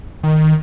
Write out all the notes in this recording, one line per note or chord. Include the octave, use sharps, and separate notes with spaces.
D#3